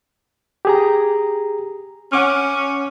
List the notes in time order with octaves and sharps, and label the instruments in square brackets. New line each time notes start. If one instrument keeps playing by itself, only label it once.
[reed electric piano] G4 G#4 A#5
[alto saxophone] C#4 [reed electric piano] F#5 D6 F6